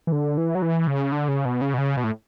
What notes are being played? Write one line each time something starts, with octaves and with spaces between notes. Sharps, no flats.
E3
D3
E3
F#3
E3
C#3
D3
C#3
B2
C#3
B2
C#3
B2
A2